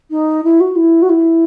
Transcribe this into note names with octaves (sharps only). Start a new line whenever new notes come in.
D#4
E4
F#4
E4
F#4
E4